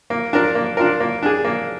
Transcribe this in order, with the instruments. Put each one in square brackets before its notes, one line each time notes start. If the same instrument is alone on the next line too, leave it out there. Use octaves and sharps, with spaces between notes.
[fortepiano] A#3
D4 F4 A#4
A#3
D4 F4 A#4
A#3
D4 G#4
A#3